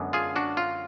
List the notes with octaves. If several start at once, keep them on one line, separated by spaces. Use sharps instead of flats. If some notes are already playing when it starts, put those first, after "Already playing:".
Already playing: F#2 D3 G#3 B3 D4
F4 G#4
D4 F#4
F4